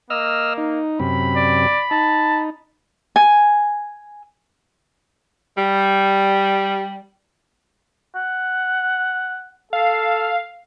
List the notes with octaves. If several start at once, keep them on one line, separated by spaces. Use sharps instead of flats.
A#3 D#5 E6 F6
D#4
F#2 C3 B5
D5
D#4 A5
G#5
G3
F#5
A4 F5